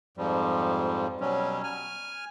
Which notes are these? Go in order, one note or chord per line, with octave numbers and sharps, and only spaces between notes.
F2 G#2 F3 G3
B2 F#3 G3 C#4
G#5 F6